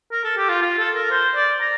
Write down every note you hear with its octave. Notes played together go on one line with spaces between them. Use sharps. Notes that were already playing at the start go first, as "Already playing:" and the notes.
A#4
A4
G4
F4
F4
A4
A#4
C5
D5
A#5